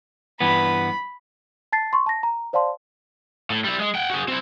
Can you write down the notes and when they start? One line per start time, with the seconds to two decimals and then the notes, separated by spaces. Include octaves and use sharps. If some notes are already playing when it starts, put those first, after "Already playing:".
0.40 G2 E3 B3 B5
1.72 A5 A6 C7
1.93 C6 C#6
2.06 A5 A#6
2.23 A#5
2.53 C5 D5 F5 A5 C6
3.50 A2
3.64 G3 E4
3.80 G#3
3.95 F#5 G5
4.10 F#4 G#4
4.28 C4 E4